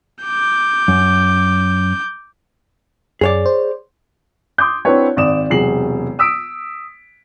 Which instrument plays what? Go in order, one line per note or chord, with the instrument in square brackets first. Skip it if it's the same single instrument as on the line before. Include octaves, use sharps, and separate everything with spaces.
[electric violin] D6 G6
[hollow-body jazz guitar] F#2
[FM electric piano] F#2 [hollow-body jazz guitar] G#4 C#5 D5
[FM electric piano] C5
[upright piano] C6 D6 D#6 G6
C4 D4 E4 F#4 B4 C#5
G#1 D5 D#6 E7
E1 C3 F#3 G#4 C7 F#7
D#6 E6 B6 D7